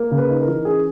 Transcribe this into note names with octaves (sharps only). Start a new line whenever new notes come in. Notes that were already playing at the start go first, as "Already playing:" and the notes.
Already playing: A#3
C#3
B4
D#4
A#4
E3
C#4 G#4